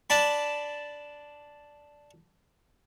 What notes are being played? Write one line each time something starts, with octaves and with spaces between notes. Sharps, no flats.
D4 A5 B5